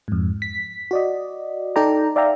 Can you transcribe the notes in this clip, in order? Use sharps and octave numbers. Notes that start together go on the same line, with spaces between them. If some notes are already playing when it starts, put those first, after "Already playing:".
F2 G#2
B6
F#4 D5 D#5
D#4 A4 D5 G5 A#5
D5 E5 F5 G5 A#5